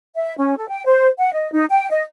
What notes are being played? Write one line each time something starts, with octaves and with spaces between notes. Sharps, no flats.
E5
C#4
A4
G5
C5
F#5
D#5
D#4
G5
D#5